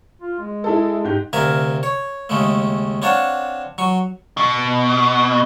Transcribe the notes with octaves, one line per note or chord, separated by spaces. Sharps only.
F4
G#3
E4 G#4 A4
G#2 G4 G6
D2 C3 A#4 E5 F5 G#5
C#5
D#2 C#3 G#3 A3
C4 D4 C#5 F5 F#5 A5
F#3 C#6
B2